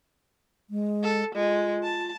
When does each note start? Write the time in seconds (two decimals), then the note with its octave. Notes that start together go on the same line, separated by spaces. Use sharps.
0.70 G#3
1.03 A4
1.35 G#3 F4
1.83 A5